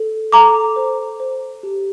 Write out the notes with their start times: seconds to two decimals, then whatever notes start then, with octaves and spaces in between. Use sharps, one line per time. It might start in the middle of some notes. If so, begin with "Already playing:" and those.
Already playing: A4
0.32 A4 A#5 D6
0.76 C5
1.20 C5
1.63 G4